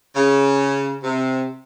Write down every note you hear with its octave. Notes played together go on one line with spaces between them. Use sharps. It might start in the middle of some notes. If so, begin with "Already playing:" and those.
C#3
C3